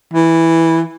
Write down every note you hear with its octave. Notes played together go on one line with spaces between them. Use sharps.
E3